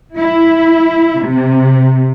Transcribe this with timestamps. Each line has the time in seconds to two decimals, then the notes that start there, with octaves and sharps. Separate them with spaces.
0.17 E4
1.24 C3